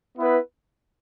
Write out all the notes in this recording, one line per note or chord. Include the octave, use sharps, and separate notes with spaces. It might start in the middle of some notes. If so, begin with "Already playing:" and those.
B3 E4 B4